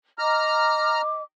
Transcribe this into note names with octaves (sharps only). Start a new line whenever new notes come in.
D#5 A#5 D6 F6